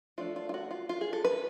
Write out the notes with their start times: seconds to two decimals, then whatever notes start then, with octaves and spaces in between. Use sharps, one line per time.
0.18 F3 A3 D4 F4
0.36 F4
0.49 F4
0.54 F#4
0.71 F4
0.89 F4
1.01 G#4
1.13 A4
1.25 B4